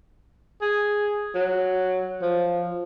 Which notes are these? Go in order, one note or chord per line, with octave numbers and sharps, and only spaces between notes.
G#4
F#3
F3